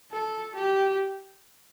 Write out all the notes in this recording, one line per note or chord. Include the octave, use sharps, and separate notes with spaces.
A4
G4